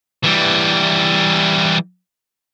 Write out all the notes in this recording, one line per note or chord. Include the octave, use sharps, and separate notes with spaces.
E3 G3